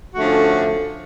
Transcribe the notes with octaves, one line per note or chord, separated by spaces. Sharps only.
D3 F3 A3 C#4 F#4